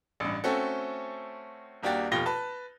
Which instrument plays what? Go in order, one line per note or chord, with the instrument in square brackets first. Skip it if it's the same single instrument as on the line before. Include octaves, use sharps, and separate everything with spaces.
[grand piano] A1 G2
A3 C4 C#4 F#4 A4
D#1 A#3 D4 F#4 G4 A6
F1 B2 F4 G4 A#6 G7
B4 A5